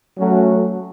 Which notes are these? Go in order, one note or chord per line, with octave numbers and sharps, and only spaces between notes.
F#3 A3 C#4 F#4